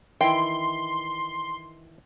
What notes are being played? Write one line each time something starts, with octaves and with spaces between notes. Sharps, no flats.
D#3 E3 E4 G5 C6